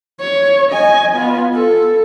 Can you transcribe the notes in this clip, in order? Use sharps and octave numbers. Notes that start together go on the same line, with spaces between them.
C#5
D#5 G#5
B3 F4
A4